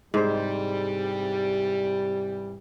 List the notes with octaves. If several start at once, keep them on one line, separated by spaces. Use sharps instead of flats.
G#2 C3 E3 G3 C5